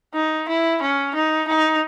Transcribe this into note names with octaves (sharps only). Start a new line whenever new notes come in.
D#4
E4
C#4
D#4
D#4